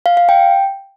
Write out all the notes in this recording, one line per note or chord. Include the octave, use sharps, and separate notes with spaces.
F5
F5
G5